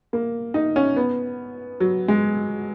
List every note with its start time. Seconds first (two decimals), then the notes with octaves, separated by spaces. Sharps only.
0.13 A#3
0.54 D#4
0.76 C#4
0.96 B3
1.80 F#3
2.08 G#3